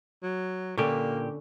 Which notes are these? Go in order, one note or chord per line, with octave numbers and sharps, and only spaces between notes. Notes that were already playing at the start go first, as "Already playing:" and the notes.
F#3
A#2 D3 A#3 C#4 G4